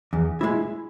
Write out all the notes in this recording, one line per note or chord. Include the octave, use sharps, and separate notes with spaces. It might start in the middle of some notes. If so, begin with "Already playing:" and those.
E2
G#3 C#4 E4